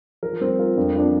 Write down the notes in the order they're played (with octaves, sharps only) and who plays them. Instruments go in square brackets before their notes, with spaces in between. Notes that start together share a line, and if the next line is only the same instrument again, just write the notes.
[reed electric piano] F3 [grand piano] A#4
[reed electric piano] F3
[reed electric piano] G3 [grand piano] C4
[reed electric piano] F4 [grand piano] A#4
[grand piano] F2 [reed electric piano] D4
[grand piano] F3 [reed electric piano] D4
[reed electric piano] C4